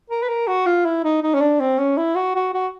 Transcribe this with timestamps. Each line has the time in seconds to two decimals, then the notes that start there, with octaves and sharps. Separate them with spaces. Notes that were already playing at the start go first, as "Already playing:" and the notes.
0.10 A#4
0.22 B4
0.29 A#4
0.48 F#4
0.66 F4
0.85 E4
1.04 D#4
1.23 D#4
1.34 C#4
1.41 D4
1.60 C4
1.79 C#4
1.97 E4
2.15 F#4
2.35 F#4
2.54 F#4